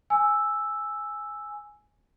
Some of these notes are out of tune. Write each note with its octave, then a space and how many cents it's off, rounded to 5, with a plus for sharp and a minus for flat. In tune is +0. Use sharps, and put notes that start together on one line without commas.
G#5 +0 E6 +0